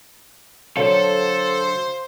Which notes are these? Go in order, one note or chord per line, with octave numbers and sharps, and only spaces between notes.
D3 F#3 A4 C5 F5